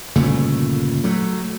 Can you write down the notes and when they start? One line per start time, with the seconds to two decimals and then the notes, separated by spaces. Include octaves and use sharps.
0.16 G1 A#2 C#3 A3
1.04 F#3 A3